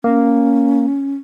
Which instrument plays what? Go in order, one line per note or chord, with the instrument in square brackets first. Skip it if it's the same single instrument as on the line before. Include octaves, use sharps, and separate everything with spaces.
[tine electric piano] A#3 [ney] C#4